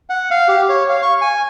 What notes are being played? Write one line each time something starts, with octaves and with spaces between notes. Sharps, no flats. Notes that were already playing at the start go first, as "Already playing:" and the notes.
F#5
F5
G4
C#5
F5
C#6
G#5